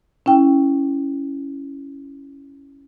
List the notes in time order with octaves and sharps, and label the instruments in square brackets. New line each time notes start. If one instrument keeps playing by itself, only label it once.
[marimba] C#4 E4 G5